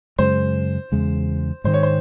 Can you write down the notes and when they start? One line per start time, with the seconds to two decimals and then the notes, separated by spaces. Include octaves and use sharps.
0.19 F#2 C#3 G#3 C5
0.92 E2 C#3 G#3
1.64 G#2 D#3 G#3 C5
1.74 C#5
1.83 C5